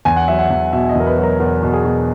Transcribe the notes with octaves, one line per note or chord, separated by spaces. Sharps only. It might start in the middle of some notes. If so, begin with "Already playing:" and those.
E2 G#5
F#5
F#3 E5
F#5
E2
B2 E5
D#5
E2 A#4
B4
F#3
A#4
E2 A#4
B2
G#4
B2